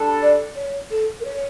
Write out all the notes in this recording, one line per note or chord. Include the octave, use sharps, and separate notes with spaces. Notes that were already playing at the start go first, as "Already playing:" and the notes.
Already playing: G3 D4 A4
D5
C#5
A4
A#4
C#5